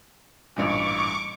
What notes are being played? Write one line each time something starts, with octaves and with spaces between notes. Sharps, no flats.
A1 G2 A#2 C#6 D6